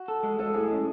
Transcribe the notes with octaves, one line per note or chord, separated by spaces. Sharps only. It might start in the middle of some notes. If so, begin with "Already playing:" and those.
Already playing: F#4
A4
G#3
G#3 A4
A2 G#4
G#3 C#4